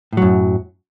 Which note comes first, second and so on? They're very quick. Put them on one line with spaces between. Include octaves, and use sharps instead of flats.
A2 F#3 F#2